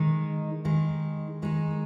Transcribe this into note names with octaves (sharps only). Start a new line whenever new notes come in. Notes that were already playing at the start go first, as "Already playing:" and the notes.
Already playing: D#3 G#3 D#4
D#3 G#3 D#4
D#3 G#3 D#4